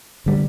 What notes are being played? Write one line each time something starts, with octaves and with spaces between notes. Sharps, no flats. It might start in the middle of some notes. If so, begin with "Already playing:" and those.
D3 G3